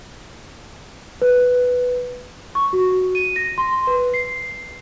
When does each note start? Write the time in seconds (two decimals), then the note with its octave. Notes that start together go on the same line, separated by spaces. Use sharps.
1.22 B4
2.55 C#6
2.73 F#4
3.15 D#7
3.36 A#6
3.58 C6
3.87 B4
4.14 C7